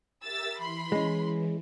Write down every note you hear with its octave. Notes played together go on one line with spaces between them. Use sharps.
G4 A#4 E5 E6 A6
E3 B5 C6
G#3 C#4